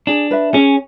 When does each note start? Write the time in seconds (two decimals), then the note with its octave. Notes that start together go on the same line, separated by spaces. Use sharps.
0.07 D4 G#4
0.31 B4 E5
0.53 C#4 G#4